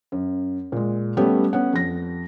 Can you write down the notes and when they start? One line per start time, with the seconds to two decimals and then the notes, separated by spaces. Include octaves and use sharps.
0.12 F#2
0.72 A#2 G#3
1.17 G3 A3 B3 C#4 G4
1.53 B3 C#4 F#5
1.73 F2 A#6